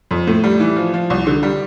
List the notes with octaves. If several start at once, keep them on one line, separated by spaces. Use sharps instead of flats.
F2
A2
G3
E3
F3
F3
C2
D3
G3